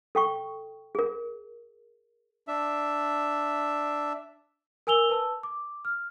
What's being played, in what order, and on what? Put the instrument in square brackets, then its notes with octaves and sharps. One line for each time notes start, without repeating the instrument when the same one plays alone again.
[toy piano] A4 G5 C#6
G#4 A#4
[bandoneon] D4 E5
[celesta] A#4 G#5 E6 F7 G7
B4 A5 E6
D6
F6